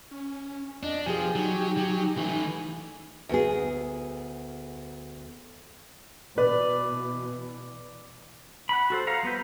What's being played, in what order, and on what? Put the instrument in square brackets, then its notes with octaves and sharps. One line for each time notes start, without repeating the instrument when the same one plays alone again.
[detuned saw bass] C#4
[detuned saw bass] F2 [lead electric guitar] D4 [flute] D#5
[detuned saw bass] B2 [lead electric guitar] F3 [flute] G4 [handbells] G#4 G#5
[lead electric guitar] F#3 [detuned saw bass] D#4
[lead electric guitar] F#3
[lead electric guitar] E3 A3 [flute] G#5
[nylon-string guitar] D2 B3 G#4
[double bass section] B2 E3 [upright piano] B4 [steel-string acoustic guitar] D5
[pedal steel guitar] F#5 B5
F#4 A4 C5
F5 F#5 A#5
G3 B3 B4 G6